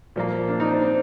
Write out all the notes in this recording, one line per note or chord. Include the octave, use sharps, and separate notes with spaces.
A#2 F3 A#3
D4
C4 D#4
D4
C4